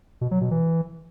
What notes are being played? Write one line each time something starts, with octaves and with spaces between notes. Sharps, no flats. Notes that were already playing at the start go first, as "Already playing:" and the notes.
B2
F#3
B2
E3